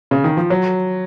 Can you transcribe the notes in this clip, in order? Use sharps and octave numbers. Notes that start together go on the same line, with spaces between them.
C#3
D#3
F3
F#3